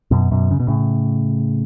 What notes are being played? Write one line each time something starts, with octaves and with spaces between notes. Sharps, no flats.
F#2 B2
F#2 B2
C#3
B2
A2 C#3